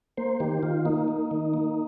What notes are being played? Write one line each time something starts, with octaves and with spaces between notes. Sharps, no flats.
A#3 C5
D#3 G4
D#3 F4
A#3 D#4
A#3
D#3
A#3